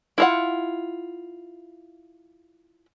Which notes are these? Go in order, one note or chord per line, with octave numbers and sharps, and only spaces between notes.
E4 F4 F#5